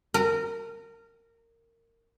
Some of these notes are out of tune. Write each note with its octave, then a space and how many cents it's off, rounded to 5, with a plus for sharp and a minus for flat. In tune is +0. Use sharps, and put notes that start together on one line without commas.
A#4 -20